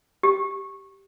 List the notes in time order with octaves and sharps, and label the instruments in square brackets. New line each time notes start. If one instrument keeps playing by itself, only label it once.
[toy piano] G4